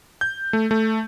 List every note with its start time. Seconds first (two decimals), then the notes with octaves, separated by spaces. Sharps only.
0.21 G6
0.53 A3
0.71 A3